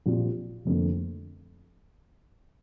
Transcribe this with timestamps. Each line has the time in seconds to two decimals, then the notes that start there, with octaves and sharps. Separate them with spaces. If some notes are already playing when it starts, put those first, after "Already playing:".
0.06 A#1 A#2 G3 C4 F4
0.65 F1 F2 D3 A#3